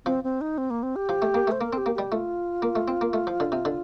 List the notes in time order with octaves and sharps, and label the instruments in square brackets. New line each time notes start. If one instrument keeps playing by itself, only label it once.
[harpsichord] F3 [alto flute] C4
[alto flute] C4
D#4
C4
A#3
C4
G4
[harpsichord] F3
A3
A#3
[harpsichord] A3 [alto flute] C5
[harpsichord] A#3 [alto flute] A#4
[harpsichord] C4 [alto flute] G4
[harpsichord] A#3
[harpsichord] G3 [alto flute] G4
[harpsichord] A3 [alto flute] F4
[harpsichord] A#3
A3
C4
A#3
A3
F3
D3
C3
D3